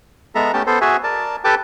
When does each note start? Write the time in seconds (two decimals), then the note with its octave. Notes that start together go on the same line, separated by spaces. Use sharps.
0.35 G#3 B3 A4 E5 A#5
0.53 A3 B3 C#4 G4 G5 A5
0.67 B3 A4 C5
0.81 F#4 G#4 E5 G#5
1.04 A#4 D5 A5
1.44 G4 A4 B4 G5 A5 D6